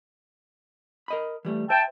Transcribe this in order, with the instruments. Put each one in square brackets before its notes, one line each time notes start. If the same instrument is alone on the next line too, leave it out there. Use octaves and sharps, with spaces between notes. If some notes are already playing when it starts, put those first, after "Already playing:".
[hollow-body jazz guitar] A#4 D#5 B5
E3 G3 A3
[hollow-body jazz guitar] C5 E5 [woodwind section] G5 A5